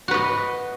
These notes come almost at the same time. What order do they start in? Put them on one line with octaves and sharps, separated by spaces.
F#4 B4 D#5